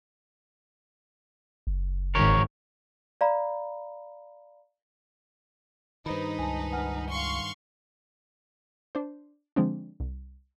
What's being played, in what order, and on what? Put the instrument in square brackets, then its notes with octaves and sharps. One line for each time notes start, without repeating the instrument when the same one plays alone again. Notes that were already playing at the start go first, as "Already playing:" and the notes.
[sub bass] F#1
[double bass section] G#1 D#3 [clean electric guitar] A#4 C#5
[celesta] D5 F5 A#5 B5
[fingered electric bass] G2 D#3 [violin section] D#4 B4 [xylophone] C5 B5
[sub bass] C#2 [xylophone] G#5 A5
[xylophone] F#5 G#5 F6
[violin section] F5 C6 C#6
[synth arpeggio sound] D4 C5
D3 F3 G#3 C4 D4
C2